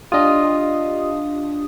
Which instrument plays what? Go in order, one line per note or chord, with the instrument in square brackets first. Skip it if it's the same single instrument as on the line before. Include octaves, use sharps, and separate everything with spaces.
[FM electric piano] D4 G4 D#6 [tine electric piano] F4 D#5